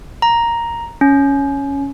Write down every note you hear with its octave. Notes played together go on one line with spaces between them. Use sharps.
A#5
C#4